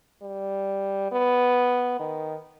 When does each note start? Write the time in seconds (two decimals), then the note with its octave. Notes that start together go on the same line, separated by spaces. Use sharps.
0.22 G3
1.12 B3
2.00 D#3